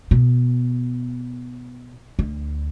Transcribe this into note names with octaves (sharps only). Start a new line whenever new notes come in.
B2
D2